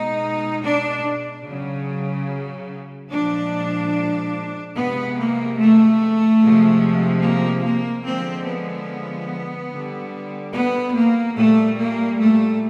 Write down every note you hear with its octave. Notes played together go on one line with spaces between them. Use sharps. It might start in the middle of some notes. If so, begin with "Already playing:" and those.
Already playing: B2 G#3 D#4
D4
C#3 F#3
A#2 F3 G#3 D4
C3 F3 G#3 B3
A#3
A3
C3 F3 G#3
A#3
A#3
D3 F3 G#3 C4
B3
D3 G3
B3
A#3
A#2 G3 A3
A#3
A3